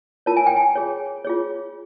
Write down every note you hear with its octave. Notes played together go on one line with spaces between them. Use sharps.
F4 A#4 C#5 A5
G#5
G5
G#5
F4 G#4 C#5
F4 G#4 C#5